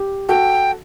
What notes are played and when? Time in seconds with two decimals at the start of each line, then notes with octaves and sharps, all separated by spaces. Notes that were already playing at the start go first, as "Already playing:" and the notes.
Already playing: G4
0.29 F#4 A4 G5